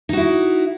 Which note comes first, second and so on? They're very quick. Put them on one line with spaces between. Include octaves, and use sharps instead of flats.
D#4 F#4 E4